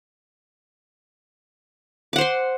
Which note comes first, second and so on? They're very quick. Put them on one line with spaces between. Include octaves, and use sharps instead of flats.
D6 F#5 C5 C6